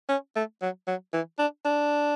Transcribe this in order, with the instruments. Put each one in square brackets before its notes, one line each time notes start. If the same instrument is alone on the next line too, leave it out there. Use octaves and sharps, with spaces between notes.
[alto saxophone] C#4
A3
F#3
F#3
E3
D4
D4